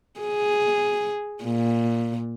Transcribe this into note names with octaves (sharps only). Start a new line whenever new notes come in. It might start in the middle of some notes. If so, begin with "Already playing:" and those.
G#4
A#2